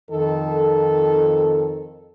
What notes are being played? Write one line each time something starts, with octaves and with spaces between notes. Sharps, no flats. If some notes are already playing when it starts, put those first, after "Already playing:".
F2 D#3 A4